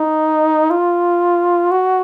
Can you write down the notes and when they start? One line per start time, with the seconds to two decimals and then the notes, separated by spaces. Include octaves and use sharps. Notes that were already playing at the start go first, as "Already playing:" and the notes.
Already playing: D#4
0.70 F4
1.71 F#4